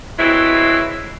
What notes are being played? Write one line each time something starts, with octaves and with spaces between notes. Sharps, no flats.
E3 F#3 G#3 C4 E4